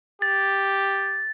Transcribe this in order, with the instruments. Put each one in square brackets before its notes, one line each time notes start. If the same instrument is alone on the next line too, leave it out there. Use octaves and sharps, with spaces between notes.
[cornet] G4 [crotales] A6